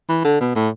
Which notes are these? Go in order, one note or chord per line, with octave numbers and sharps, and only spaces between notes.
E3
D3
B2
A2